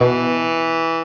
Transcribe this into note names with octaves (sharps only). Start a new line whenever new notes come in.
B2 E3